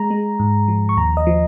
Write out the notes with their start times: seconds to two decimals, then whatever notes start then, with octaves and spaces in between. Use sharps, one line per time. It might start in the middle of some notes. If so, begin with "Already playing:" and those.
Already playing: G#3 A#5
0.11 G#3
0.39 G#2
0.68 F3
0.89 C#6
0.97 D#2 A#5
1.17 D#5
1.27 F3